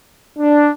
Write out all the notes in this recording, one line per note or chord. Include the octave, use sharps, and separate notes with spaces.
D4